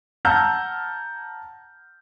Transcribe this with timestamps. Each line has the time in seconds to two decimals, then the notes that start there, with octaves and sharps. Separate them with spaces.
0.25 F#5 A5 A#5 E6 F6 G6